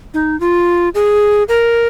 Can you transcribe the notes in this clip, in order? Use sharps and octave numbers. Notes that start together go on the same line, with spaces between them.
D#4
F4
G#4
A#4